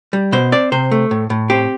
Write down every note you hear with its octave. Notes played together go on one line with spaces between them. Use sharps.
G3
B2 C5
C4 D5
C3 C5
A3
A2
A2
C4 G4